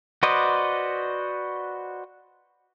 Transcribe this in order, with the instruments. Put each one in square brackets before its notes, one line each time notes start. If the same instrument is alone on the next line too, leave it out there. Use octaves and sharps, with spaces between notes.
[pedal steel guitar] F#4 B4 C5 D5 D#5